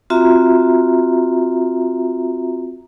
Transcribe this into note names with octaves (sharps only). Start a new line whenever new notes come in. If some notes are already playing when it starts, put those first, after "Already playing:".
C4 F4 F#4 E5 A#5